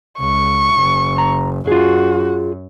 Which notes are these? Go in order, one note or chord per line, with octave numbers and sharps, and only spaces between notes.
C#2 C#6
F#1
A#5
F#2 F4 F#4 G#4